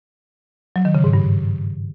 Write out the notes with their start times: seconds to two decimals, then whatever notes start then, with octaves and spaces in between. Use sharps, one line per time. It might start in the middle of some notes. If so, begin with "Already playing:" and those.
0.76 F#3
0.85 D#3
0.95 C#3
1.04 G#2
1.13 G2